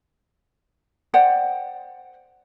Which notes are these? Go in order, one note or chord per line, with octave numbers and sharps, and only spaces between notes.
C5 D5 F#5 G5